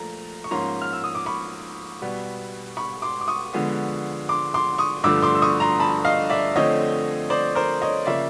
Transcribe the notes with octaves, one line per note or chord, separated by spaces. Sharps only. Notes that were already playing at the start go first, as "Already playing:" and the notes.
Already playing: A#2 F3 A3 A#5
C#6
G#2 F3 A#3 C#4 A#5 C6
F6
E6
D#6
D6
B5 C#6
B2 G3 B3
B5 C#6
C6 D6
D6
C#6 D#6
D3 F3 G#3 B3
C6 D6
C6 D6
C#6 D#6
G2 D3 F3 A3 D6 E6
C6 D6
E6
C#6 D#6
A#5 C6
A5 B5
D#5 F5
D5 E5
D3 F3 A3 C4 C#5 D#5
C5 D5
A#4 C5
C#5 D#5
C#3 F3 A#3 D5 E5